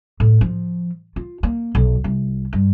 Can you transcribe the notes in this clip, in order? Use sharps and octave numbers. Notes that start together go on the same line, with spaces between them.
A2
F3
F4
A#3
B1
C2
G2